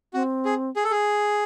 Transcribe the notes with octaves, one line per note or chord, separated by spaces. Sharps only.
C4 F#4
G#4
G#4
A4
G#4